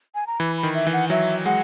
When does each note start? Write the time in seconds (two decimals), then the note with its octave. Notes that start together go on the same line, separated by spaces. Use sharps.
0.15 G#5
0.27 A#5
0.39 E3 B5
0.57 B5
0.63 D#3
0.75 E5
0.87 E3
0.93 F#5
1.10 F#3 E5
1.46 G#3 F#5